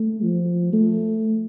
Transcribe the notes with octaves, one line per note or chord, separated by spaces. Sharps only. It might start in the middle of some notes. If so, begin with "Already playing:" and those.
Already playing: A3
F3
A3